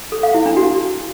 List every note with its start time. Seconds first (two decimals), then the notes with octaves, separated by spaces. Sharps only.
0.12 A4
0.23 F5
0.34 E4
0.46 D4
0.57 F#4